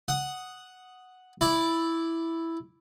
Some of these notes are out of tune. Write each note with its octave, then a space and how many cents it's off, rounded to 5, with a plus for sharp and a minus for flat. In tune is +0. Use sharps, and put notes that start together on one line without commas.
F#5 +0 D#6 +0
E4 +0 D5 -5